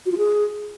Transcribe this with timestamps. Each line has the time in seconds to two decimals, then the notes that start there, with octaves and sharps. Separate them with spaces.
0.06 F#4
0.12 F4
0.18 G#4